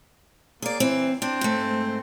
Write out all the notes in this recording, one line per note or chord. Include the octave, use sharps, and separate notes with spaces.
A#3 G#4 D5
E3 C4
C4 D4
G#2 A3